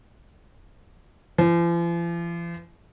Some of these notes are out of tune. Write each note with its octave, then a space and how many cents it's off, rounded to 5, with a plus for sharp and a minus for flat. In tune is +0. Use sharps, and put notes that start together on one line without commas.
F3 -45